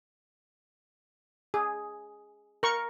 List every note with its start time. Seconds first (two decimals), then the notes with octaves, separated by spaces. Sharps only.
1.54 G#4
2.63 A#4 C#6